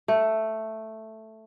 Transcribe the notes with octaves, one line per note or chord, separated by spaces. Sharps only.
A3